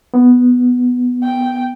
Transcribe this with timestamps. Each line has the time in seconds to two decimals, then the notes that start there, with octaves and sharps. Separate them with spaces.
0.14 B3
1.23 G5